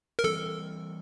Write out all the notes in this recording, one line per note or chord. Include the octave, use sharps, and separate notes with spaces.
A#4
E3 G3 C4 A4